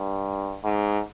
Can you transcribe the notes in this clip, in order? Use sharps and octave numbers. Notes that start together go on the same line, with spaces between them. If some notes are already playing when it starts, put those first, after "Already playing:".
Already playing: G2
G#2